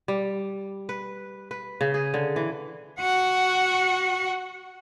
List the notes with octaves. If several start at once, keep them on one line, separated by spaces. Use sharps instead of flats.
G3
B4
B4
C#3
G#4
D3
E3
F#4 F#5